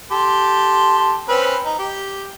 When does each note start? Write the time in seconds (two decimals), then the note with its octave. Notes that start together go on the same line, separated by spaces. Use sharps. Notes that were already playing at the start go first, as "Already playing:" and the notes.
0.12 G4 A4 C6
1.29 C4 C#4 B4
1.65 D#4
1.79 G4